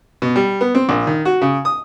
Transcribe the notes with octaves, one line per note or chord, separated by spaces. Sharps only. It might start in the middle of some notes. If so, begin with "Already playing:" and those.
B2
G3
B3
C4
A#1
D#3
F#4
C#3
D#6